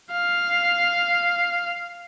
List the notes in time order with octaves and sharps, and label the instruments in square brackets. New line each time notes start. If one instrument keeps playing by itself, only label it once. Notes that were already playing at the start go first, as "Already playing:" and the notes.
[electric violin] F5